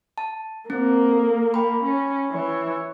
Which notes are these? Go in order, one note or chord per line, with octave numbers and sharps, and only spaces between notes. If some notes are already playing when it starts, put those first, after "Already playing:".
A5
A#3 C4 C5
A4
G5 B5
C#4
E3 C#5